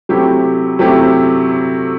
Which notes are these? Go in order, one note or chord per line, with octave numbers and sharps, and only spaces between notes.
C3 F#3 A3 E4 G4
C3 F#3 A3 E4 G4